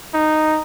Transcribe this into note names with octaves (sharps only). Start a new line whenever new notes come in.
D#4